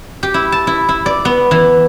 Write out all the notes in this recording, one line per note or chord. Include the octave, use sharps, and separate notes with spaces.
G4
E4
A5
E4
E4
D5
B3
E3